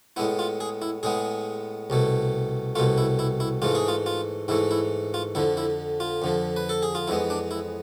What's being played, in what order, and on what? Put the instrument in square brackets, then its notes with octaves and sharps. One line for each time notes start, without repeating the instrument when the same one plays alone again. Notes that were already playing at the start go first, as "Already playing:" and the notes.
[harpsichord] A2 G#3 B3 E4
F4
G#4
E4
A2 G#3 B3 G#4
C2 B2 A3
C2 B2 A3 F4
E4
E4
E4
G#2 E3 A3 F4
G#4
F4
F4
G#2 E3 A3 E4
E4
F4
F2 D3 F3 E4
E4
F4
F2 D3 F3
B4
A4
G#4
F4
F2 E3 G#3 B3 E4
D4
E4